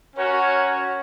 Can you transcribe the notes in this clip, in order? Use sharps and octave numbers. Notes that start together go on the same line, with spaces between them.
C#4 F#4 A#4 C#5